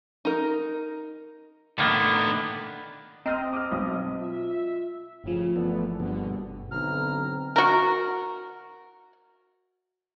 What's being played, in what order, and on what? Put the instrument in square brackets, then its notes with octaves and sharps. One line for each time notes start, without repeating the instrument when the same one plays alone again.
[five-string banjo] D#4 A#4
[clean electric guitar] A2 A#3 B3 [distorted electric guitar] D3 D#3
[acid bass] C4 [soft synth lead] D#5 [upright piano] A#5 F6 D#7
[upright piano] D6 E6 F6
B1 D#6
[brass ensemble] F4 E5
[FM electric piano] G1 F3 [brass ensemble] A2 C#3
[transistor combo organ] E3 A3 B3 [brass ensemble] D5
[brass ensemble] A#1 D3 [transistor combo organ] G2 B2
[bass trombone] B1 [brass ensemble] D3 C4 A#5 [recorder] F6
[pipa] F#4 A#4